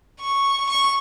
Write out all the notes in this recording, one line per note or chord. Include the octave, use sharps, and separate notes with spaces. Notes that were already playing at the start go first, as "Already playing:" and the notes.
C#6
C#6